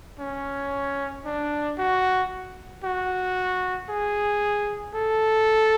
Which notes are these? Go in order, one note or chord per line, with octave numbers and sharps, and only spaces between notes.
C#4
D4
F#4
F#4
G#4
A4